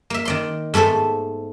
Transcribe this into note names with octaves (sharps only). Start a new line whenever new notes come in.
A#3 E5
D#3 D5 C6
G#2 A3 B3 A4 C5